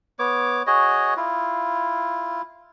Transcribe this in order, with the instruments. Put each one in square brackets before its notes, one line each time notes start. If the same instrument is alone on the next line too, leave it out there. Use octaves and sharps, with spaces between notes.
[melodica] B3 C#5 D6
F#4 G#4 C#5 D#5
E4 F4